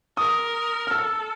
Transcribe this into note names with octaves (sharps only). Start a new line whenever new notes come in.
A#4 D#6
F6
A4 E6